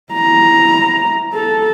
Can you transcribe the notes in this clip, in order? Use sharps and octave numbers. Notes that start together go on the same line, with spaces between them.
E4 A#5
A4